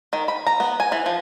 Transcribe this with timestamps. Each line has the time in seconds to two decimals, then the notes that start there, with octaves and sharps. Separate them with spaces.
0.13 D#3
0.28 B5
0.47 A#5
0.60 B3
0.80 G#5
0.92 E3
1.06 F3